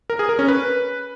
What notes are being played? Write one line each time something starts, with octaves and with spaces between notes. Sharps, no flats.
A#4
G#4
A#4
C#4
B4